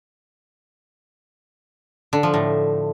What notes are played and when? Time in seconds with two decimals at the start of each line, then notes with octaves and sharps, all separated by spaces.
2.13 D3
2.23 F3
2.34 A2